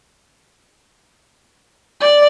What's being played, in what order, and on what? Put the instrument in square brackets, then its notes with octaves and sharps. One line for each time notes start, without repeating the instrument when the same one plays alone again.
[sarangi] D5